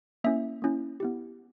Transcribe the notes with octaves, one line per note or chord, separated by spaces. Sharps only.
A#3 C#4 E4 E5
A#3 C#4 E4
B3 E4 G4